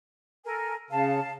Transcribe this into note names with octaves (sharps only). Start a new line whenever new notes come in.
A4 A#4 G#5
C#3 F5 A5